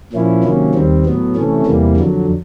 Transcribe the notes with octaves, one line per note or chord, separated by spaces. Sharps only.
A#2 F3 A#3 C#4 E4
C3 D#3 F#3 A#3 C#4
D#2 D#3 G3 C4
A2 F#3 B3
C3 E3 A3 C#4
E2 C3 E3 G3 A#3
F2 D3 F#3